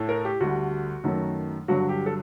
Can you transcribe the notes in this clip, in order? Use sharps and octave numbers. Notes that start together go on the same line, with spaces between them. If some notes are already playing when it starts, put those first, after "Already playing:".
Already playing: A2 A3
A#4
G4
D2 D3 G3 F#4
F#2 D#3 F#3 A3
G2 D3 F#3 F#4
G4
A4